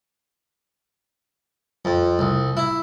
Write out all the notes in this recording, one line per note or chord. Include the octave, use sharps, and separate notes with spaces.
F2
C2
E4